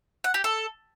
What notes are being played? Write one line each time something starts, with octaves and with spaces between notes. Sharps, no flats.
F#5
G4
A4